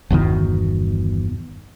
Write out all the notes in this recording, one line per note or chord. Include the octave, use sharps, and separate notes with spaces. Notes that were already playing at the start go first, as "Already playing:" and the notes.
G1 E2 B2 D#3